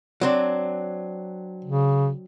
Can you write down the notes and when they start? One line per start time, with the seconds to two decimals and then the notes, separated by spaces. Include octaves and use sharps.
0.21 F#3 C4 D4
1.65 C#3